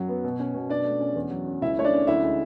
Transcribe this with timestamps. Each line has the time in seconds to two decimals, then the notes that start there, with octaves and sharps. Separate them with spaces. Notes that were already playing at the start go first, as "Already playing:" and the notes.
Already playing: F#2 F#3
0.09 B3
0.24 B2
0.40 C#4
0.54 B2
0.70 B2 D4 D5
0.85 A3
1.00 C#4
1.15 E2
1.31 F#3
1.47 C#4
1.62 C#2 E4 E5
1.77 A3 C#5
1.84 D4 D5
1.92 C#4
2.07 D2 E4 E5
2.23 G#3